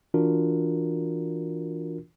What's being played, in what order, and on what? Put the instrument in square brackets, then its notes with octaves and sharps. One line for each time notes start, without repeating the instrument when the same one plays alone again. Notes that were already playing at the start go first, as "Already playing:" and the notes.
[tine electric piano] E3 D4 F4 F#4 A#4